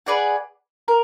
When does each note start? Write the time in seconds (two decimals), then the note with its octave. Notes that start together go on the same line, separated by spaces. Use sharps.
0.06 G#4 B4 D5 F#5
0.88 A#4